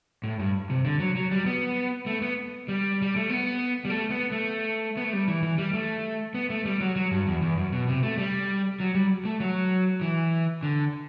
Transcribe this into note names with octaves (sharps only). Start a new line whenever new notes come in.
A2
G2
C3
D3
F#3
F#3
G3
B3
A3
B3
G3
G3
A3
B3
G3
A3
B3
A3
B3
A3
G3
E3
E3
G3
A3
B3
A3
G3
F#3
F#3
G2
E2
E2
F#2
B2
C3
A3
G3
F#3
G3
A3
F#3
E3
D3